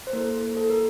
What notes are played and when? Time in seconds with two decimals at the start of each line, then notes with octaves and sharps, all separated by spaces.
0.07 C5
0.13 A#3 E4 A4 A#4
0.57 A4
0.70 A#4